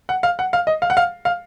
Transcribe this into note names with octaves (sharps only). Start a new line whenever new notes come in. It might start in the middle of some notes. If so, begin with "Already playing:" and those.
F#5
F5
F#5
F5
D#5
F5
F#5
F5
F5